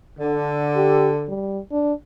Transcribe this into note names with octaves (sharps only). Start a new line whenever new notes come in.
D3
G4
G3
D4